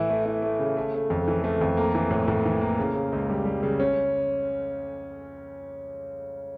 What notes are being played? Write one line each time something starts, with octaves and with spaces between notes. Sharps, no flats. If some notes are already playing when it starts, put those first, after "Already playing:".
Already playing: A2 E3 E4
A3
E4
A3
C#3
A3
A3
F2
E3
A3
F2
A#3
E3
A2
A2
E3
A#3
C#3
C#3
C#2
G3
G3
C#3
C#4